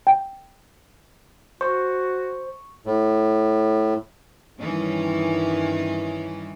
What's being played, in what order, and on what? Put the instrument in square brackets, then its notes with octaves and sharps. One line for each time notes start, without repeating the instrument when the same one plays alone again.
[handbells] G5
[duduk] F#4 [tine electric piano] C5 [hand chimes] C#6
[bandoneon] A2
[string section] G2 D#3 E3 C#4